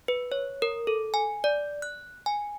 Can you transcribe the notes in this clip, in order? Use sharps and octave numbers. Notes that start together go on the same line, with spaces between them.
B4
C#5
A#4
A4
G#5
D5
F#6
G#5